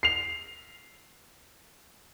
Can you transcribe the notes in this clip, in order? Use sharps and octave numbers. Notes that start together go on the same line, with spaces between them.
C7 F7